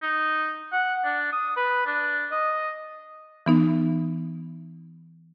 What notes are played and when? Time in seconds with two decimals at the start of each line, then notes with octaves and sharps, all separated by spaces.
0.02 D#4
0.72 F#5
1.05 D4
1.33 D#6
1.57 B4
1.86 D4
2.32 D#5
3.46 E3 B3 D#4